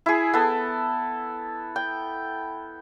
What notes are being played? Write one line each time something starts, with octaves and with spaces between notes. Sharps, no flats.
E4 G#4
B3 A4
G5